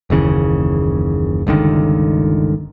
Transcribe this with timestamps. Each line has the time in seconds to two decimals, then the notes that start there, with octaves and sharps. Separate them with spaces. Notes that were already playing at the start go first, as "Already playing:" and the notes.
0.10 F#1 D#2 C#3 E3
1.47 G1 C#2 D3 D#3